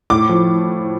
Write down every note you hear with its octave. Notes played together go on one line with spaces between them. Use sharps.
A2 D6
F3